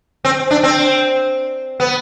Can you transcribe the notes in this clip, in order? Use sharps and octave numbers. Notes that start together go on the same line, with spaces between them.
C4
D4
C4
B3